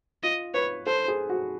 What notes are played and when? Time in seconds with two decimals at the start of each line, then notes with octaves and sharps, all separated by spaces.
0.23 F4 D#5
0.54 B4 C#5
0.87 A4 C5
1.08 G#4
1.29 F#4